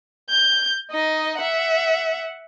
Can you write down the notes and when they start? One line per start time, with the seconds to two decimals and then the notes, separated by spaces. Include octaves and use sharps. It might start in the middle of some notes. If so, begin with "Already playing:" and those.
0.30 G6
0.91 D#4 D#5
1.40 E5 F#5